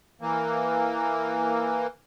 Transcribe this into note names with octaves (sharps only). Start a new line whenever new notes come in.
E3 A#3